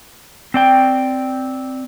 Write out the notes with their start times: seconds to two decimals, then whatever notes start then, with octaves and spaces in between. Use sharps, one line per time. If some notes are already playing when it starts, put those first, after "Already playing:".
0.54 C4 D5 G5